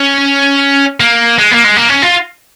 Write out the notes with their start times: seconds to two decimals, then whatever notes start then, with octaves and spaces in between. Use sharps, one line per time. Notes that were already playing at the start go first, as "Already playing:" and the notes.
Already playing: C#4
1.00 A#3
1.39 G#3
1.51 A#3
1.64 G#3
1.77 A#3
1.89 C#4
2.02 F4